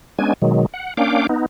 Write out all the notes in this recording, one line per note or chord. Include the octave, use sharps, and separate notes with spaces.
G#3 B3 C#4 D4 G#5
B2 D#3 F#3 G#3
F#5
A#3 C#4 D4 F5 G5 D6
B3 D#4